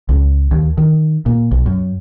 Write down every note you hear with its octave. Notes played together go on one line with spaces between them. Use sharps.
C#2
D#2
D#3
A#2
B1
F#2